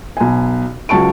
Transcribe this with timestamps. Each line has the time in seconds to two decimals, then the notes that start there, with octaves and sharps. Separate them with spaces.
0.17 B1 G#5
0.89 C#2 F#3 A5 C#6 D7